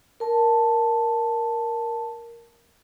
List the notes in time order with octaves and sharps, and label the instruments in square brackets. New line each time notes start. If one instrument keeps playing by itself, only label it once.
[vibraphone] A#4 A5